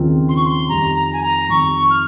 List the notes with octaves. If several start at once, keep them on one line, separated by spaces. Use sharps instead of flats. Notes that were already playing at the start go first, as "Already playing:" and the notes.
Already playing: D#2 C#3 F3 C4 F4
C6
C#6
C6
F2 D#3 G3 A#5
A#5
G#5
A#5
F2 D#3 G3 C#6
F6